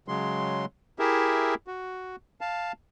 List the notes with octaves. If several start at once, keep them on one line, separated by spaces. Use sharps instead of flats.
C#3 F#3 G#3 C6
E4 G4 G#4 A#4 E5
F#4
F5 A5